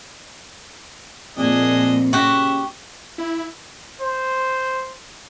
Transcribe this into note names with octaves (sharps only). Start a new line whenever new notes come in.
F2 A#2 D4 G#4 D#5
C#3 F#4 G4 E5
E4
C5